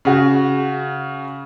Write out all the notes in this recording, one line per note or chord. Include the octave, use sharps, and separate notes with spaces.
C#3 F#4